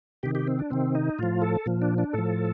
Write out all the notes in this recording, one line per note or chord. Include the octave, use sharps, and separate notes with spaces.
C3 D#3 G4
G4
C4
D4
C3 D#3 C4
D#4
A2 F3 F4
A4
A#2 F3
D4
D4
A2 F3 A4